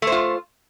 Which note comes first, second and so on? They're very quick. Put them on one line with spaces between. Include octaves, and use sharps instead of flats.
A3 C5 F4